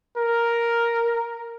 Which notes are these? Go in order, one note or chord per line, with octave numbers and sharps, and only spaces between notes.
A#4